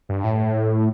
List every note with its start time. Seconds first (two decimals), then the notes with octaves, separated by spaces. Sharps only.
0.09 G2
0.24 A2